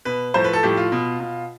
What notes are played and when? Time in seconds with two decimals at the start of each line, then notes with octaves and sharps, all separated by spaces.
0.05 B2 B4
0.34 A2 F3 C5
0.44 B4
0.53 A4
0.63 A2 F3 G4
0.77 F4
0.92 B2
1.20 B2